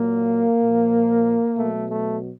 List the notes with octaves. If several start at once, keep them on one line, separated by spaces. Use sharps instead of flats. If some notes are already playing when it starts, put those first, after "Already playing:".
Already playing: A#2 F#3 A#3
A#2 F3
B2 F#3 A3
A3